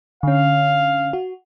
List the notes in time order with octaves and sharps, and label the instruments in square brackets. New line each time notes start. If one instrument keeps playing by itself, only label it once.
[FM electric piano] D3 C#4 [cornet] F5
[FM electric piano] F#4